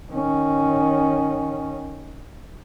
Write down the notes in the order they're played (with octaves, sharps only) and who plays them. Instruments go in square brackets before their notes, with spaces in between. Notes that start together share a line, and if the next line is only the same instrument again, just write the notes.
[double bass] D#3 C#4